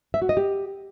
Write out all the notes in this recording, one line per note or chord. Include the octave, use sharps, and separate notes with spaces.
E5
F#4
D#5
G4